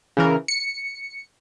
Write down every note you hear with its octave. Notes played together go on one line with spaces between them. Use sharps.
C#3 E3 A#4
C#7